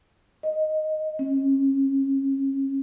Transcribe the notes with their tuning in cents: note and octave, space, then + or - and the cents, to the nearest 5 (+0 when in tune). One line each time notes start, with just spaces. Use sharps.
D#5 +0
C#4 -30